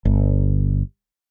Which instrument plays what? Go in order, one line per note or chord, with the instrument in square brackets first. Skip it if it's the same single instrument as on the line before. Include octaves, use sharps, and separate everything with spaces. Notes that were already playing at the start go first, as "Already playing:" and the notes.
[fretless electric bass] G1